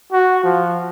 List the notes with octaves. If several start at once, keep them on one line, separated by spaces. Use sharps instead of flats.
F#4
F3